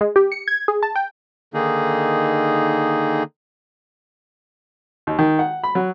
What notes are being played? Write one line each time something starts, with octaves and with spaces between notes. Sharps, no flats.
G#3
G4
C#7
G#6
G#4
A5
G5
D3 D#3 A#3 D#4 G#4
D#2
D#3
F#5
B5
F#3